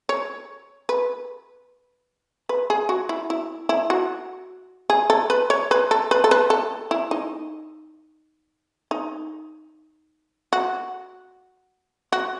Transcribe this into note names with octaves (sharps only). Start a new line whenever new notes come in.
C#5
B4
B4
G#4
F#4
E4
E4
E4
F#4
G#4
A4
B4
C#5
B4
A4
B4
A4
B4
A4
E4
D#4
D#4
F#4
F#4